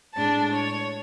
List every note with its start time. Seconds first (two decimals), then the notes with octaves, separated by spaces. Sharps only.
0.14 A2 G#3 D4 A5
0.51 C#5